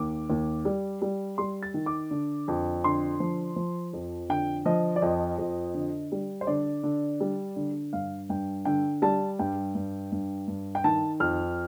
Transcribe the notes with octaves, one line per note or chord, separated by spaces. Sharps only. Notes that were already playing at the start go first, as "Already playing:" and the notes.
Already playing: D#2 D6
D#2
G3
G3
G3 C6
A6
D#3
D6
D3
F2
D3 C6
F3
F3
F2
D3 G5
F3 D#5
D5
F2 D#5
F2
D3
G3
C5
D3 D5
D3
G3
D3
G2 F5
G2 G5
D3 G5
G3 A5
G2 G5
G2
G2
G2
G5
D#3 A5
F2 F6